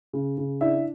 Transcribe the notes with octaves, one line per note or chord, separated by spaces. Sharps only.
C#3
C#3
D4 E4 E5